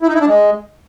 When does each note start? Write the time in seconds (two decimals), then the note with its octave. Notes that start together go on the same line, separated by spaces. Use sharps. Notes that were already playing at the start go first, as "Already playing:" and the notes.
0.02 E4
0.08 D#4
0.14 E4
0.21 D4
0.27 G#3